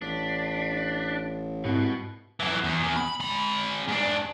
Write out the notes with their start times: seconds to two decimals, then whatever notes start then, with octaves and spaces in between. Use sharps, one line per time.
0.02 A1 D4 B6
1.65 C2 G#2 B2 F#4
2.40 F#2 E3
2.64 E2
2.83 E2
2.97 B5
3.20 G#3 B5
3.89 G#2 D4